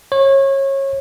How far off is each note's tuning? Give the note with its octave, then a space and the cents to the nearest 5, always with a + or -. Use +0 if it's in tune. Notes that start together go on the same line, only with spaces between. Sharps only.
C#5 -25